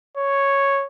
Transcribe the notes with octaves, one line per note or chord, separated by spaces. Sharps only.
C#5